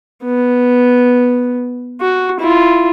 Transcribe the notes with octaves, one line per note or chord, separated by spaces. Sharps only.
B3
F#4
E4 F4